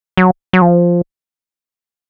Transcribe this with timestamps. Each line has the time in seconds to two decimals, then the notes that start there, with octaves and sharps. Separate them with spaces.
0.17 F#3
0.53 F#3
0.62 F3